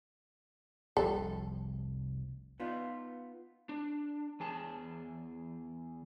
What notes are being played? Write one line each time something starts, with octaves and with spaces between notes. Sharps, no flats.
F1 C2 F3 A4
B3 D#4 F4
D4
E2 G#4 A5